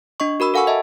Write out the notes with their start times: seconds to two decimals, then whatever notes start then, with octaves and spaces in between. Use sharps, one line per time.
0.20 D4 D#5 C#6
0.40 F#4 A#4 B5 E6
0.54 A4 F5 F#5 G#5 C#6 E6
0.67 D#5 E5 A5